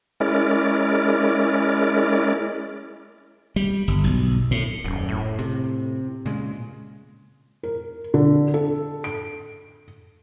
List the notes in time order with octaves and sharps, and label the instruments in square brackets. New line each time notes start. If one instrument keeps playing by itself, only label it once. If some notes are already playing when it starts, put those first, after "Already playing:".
[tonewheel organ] G#3 C#4 E4 A#4 D5
[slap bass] G3
G1
B1
A2
[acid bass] D#1 [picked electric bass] F#2
[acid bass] A2
[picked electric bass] C3
A#2 C#3 G#3
[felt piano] A#4
D3
A4
D7